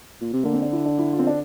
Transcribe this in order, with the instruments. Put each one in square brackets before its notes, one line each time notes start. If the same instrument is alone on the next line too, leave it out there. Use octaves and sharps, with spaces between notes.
[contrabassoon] A#2
C3
[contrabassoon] D3 [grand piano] A#3
[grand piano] C4
D4
E4
D4
E4
F4
C4
D4